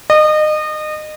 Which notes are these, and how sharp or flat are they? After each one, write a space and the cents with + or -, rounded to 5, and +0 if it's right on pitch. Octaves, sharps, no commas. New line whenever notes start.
D#5 -30